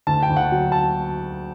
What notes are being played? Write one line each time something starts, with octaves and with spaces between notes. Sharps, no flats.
D2 A5
G5
D2
F#5
F#3
A5